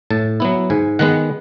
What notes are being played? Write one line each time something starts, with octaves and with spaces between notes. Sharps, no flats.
A2 A5
F#3 B3 E4
G#2 G#5
D#3 G#3 B3 F#5